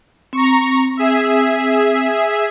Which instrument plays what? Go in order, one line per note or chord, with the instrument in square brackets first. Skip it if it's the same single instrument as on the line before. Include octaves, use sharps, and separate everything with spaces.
[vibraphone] C4 [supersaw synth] A#5 C#6
[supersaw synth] G#4 E5